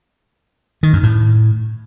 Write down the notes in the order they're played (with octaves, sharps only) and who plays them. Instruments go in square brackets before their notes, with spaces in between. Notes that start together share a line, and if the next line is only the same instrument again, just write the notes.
[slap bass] D#3
F#2
A2